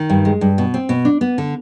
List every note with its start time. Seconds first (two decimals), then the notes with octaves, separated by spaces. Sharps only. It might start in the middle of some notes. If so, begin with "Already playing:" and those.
Already playing: D#3
0.09 G2
0.25 G#3
0.41 G2
0.58 B2
0.74 C4
0.89 B2
1.05 D4
1.21 B3
1.38 D3